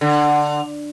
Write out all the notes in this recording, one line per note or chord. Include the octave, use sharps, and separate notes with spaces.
D3